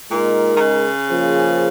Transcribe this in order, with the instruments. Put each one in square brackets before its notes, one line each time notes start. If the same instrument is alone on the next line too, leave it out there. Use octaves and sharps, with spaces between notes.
[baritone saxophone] A#2 [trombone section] G#3 D#4 A#4
[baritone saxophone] D#3
C#3
[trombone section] F3 A#3 C#4 G#4 C5